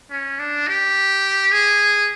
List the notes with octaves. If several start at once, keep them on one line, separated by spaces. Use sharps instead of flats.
C#4
D4
G4
G#4